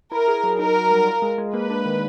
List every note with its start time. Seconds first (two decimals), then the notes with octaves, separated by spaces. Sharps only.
0.12 E4 A#4
0.28 G#4
0.43 F#3
0.59 D#4 A#4
0.75 F#4
0.91 G3
1.07 F4
1.22 G#3
1.38 G#3
1.53 A#3 B4
1.70 D4
1.85 D#3